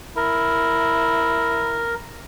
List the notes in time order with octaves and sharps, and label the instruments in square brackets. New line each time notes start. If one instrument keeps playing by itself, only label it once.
[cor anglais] E4 [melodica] A#4